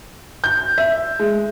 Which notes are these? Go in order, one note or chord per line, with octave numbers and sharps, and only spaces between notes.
G6
E5
G#3